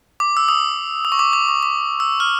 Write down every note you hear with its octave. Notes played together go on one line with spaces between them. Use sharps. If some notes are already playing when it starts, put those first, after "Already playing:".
D6
E6
D#6
D#6
C#6
D6
D6
C#6
D6
E6
F6